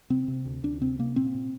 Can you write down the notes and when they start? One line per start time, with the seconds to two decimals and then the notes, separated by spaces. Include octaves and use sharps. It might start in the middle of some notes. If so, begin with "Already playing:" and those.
0.10 C3 C4
0.28 C3
0.45 D2
0.63 D2 D4
0.81 C3 C4
0.99 C3 A#3
1.16 A#2 C4
1.35 A#2